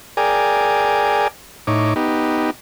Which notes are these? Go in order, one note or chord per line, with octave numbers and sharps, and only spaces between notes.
G#4 A#4 D5 G5 G#5
A2 D#4 C#5 D6
B3 D#4 G4